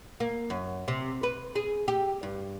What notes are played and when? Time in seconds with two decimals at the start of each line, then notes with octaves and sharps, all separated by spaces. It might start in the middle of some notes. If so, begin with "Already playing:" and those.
0.20 A#3
0.50 F#2
0.88 C3
1.23 B4
1.56 G#4
1.88 G4
2.23 G2